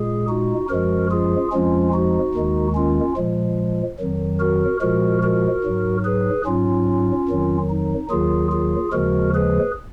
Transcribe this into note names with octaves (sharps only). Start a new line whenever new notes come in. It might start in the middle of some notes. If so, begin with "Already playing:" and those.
Already playing: A#2 G#3 G#4
D#4 F#4
F#2 F3 G#3 F#4 A#4
F4 G#4
F2 F3 G#3 C#4 F4
D#4 F#4
D#2 D#3 G#3
C#4 F4
A#2 F3 G#3
F2 D#3 F#3
F#4 A#4
A#2 F3 G#3 F#4 A#4
F#4 A#4
G#2 F#3
G#4 B4
G#2 F#3 C#4 F4
F2 D#3 F#3
D#4
D#2 D#3 F#3 F4 G#4
F4 G#4
D#2 C#3 F3 G#3 F#4 A#4
G#4 B4